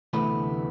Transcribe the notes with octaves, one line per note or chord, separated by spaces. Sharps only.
D2 C3 E3 A3 B3 B4